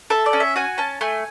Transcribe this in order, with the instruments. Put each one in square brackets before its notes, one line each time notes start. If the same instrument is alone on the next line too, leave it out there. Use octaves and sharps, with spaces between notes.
[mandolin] A4 E5
D5
C#4
E5
F#4 G#5
C#4 A5
A3 G#5